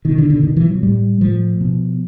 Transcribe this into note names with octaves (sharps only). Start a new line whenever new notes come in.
B2 D#3
D3
D3
B2 D#3
E3
F#3
A2 G3
A2 F3
B2